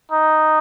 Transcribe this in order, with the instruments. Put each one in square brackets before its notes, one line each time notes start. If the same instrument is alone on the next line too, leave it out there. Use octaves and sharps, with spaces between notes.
[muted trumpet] D#4